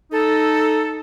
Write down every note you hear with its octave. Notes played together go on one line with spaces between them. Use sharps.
D#4 A4